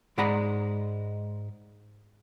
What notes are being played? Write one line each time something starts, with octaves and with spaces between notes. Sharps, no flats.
G#2 G#3 D5 F#5 A#5 B5